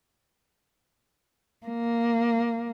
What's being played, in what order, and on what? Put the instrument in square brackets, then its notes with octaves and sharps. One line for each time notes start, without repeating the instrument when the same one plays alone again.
[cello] A#3